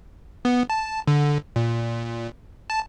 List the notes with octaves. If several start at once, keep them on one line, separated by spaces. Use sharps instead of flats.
B3
A5
D3
A#2
A5